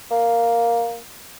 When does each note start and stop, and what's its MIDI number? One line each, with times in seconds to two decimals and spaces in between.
0.11 0.97 58